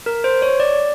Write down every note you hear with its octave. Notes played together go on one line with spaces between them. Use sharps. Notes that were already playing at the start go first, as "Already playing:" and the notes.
A#4
C5
C#5
D5